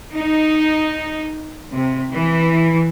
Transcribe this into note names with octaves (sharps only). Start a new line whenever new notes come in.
D#4
C3
E3